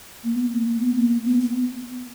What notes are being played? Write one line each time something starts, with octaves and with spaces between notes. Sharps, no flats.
A#3
B3
A#3
A#3
B3
A#3
B3
B3